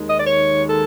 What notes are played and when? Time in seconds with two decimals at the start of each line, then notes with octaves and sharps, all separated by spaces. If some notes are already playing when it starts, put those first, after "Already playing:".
Already playing: D#2 D#3 G#3
0.09 D#5
0.19 D5
0.27 C#5
0.68 A4